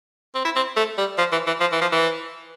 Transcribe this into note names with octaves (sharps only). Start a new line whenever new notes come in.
C4
E4
C4
A3
G3
F3
E3
E3
F3
E3
F3
E3